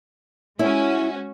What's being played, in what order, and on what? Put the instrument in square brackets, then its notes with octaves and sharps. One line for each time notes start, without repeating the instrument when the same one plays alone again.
[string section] G#3 C#4 F#4 [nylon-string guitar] E4 C#5 G#5